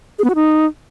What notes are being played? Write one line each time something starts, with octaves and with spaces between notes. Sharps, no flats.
G#4
B3
F#4
D#4